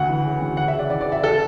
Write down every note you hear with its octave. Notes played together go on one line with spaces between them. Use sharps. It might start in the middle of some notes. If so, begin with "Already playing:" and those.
Already playing: D2 F#5
E3
C#3
D2
C#3 F#5
E5
C#3
D5
E3 D5
D5
C#3
E5
A4